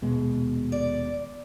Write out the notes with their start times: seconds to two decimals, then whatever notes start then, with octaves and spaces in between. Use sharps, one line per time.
0.02 D#1 B2 G#3
0.72 D5